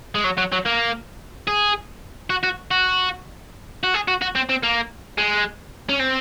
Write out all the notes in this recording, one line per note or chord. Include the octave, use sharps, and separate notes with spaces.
G#3
F#3
F#3
F#3
A#3
G#4
F#4
F#4
F#4
F#4
G#4
F#4
F#4
C4
C4
A#3
G#3
C#4
C4